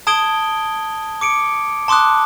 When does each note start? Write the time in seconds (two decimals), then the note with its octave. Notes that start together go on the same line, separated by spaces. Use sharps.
0.07 A5 D#6 G#6 D7 G7
1.21 D6 C#7 D7
1.88 A5 C6 D6 D#6 F#6